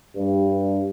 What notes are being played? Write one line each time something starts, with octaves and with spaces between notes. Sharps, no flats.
G2